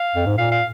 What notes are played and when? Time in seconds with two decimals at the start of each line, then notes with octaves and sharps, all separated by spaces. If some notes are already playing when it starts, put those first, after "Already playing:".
Already playing: F5
0.15 F2
0.26 G#2
0.38 A#2 F5
0.52 F5